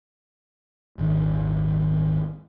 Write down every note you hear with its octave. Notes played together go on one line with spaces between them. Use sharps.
D#1 G#1 D#3 D4